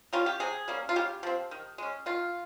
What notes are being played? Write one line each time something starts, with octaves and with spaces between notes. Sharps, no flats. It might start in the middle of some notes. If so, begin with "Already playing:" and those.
D#3 G3 C#4 F4
G4
C3 G#4
G3 A#3 C#4
F4
C#3 G4
F3 C4
D#3
G#3 C#4
D#3 F4